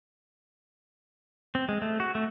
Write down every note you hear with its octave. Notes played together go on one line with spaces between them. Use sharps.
C4
G#3
A3
F#4
A3